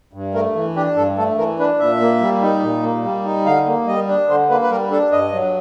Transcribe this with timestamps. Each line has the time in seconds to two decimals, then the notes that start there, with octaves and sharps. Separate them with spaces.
0.13 G2
0.34 A3 A#4
0.55 E3
0.76 D4 G4
0.96 G2 A4
1.17 A3 A4
1.38 E3 A#4
1.59 D4 B4
1.80 A#2 E5
2.01 A#3
2.21 G3
2.42 D#4
2.63 A#2
2.83 A#3
3.04 G3
3.25 D#4
3.46 D3 F5
3.67 A#3
3.87 G3 D#5
4.08 D4
4.29 D3 C5
4.50 A#3 B4
4.62 B4
4.71 G3 A#4
4.91 D4 A4
5.12 G2 D#5
5.33 F#3